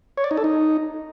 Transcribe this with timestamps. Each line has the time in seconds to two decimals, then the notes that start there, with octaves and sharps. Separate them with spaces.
0.17 C#5
0.24 D5
0.31 D#4
0.37 A4
0.44 D#4